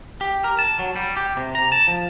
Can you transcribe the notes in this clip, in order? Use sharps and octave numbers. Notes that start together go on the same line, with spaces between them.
G4
A#4
A5
F#3
G3
G4
C3
A#5
A5
F3